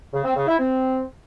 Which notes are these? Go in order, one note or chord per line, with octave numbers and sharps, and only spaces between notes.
C#3
C4
C#3
E4
C4